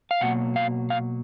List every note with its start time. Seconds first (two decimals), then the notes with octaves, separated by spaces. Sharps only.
0.11 F5
0.21 B2 F#3 A#3 F#5
0.56 F5
0.90 F5